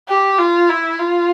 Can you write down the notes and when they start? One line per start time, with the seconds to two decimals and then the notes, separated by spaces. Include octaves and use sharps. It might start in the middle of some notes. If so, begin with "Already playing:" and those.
0.08 G4
0.38 F4
0.69 E4
0.99 F4